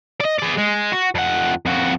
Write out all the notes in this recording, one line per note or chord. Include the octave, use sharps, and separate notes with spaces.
D5 D#5
G#4 D5
G#3
F#4
F2 F#5
F2 F#4